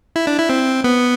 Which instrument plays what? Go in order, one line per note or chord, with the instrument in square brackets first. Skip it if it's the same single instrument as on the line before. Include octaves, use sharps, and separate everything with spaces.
[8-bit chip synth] E4
D4
E4
C4
B3